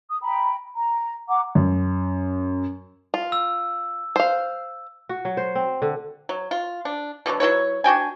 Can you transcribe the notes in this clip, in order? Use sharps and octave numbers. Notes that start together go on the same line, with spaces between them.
D#6
G5 A#5 B5
A#5
F#5 A#5 D6
F#2
F4
E6
C5 F5
F#4
F#3
C5
C4
D3
F#3
F4
D4
B2 D3 F3 F#3
F#3 E4 B4 C#5
D4 F#4 G5 G#5